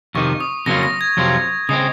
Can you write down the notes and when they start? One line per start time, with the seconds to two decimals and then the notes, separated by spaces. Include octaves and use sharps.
0.15 F2 C3 D#3 C#6
0.40 D#6
0.66 F2 C#3 F#3 A#3 F4 A#6
0.83 A#6
1.01 G#6
1.17 F2 C3 F#3 C4 F4
1.69 C#3 G#3 C4 D#6